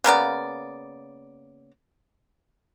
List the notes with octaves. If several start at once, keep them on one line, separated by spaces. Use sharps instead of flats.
C#3 A#3 B3 D5